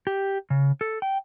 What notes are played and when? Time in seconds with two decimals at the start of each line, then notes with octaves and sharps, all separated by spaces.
0.07 G4
0.50 C#3
0.81 A4
1.02 G5